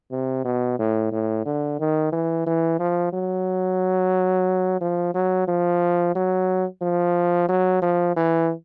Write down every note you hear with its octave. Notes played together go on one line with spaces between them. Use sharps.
C3
B2
A2
A2
D3
D#3
E3
E3
F3
F#3
F3
F#3
F3
F#3
F3
F#3
F3
E3